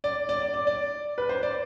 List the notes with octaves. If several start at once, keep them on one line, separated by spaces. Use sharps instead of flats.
D5
D5
D5
D5
D5
B4
C5
D5